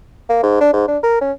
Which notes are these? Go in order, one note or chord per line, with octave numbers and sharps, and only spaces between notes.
A#3
G#2
D4
G#2
D4
A#4
C#4